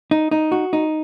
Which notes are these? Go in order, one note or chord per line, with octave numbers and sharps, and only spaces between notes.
D#4
D#4
F#4
D#4